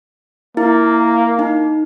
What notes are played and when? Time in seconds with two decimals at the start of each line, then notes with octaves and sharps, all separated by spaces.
0.57 A#3 E4
1.39 D#4